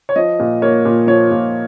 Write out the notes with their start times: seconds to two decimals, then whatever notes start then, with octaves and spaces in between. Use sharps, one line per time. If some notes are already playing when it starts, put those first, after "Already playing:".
0.09 C#5
0.16 F3 D#5
0.39 A#2
0.62 A#3 C#5
0.85 A#2
1.07 F3 C#5
1.31 A#2